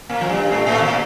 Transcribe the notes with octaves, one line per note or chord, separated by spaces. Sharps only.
A#2 A#3
F3
G2 G3
A2 A3
A2 A3
A#2 A#3